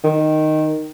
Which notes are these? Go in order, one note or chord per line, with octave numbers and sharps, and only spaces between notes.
D#3